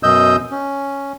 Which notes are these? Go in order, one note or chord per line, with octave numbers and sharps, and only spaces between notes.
F#2 B2 D#5 D#6 E6 G6
C#4